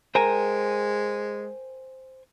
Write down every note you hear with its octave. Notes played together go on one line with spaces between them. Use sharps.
G#3 A#4 C5 G5 G#5